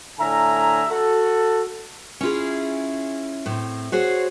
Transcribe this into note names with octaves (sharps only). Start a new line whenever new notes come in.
A2 D3 A#4 E5 G#5 A#5
F#4 A4
C#4 E4 F4 G#4
A2 C4
F#4 G#4 C5 C#5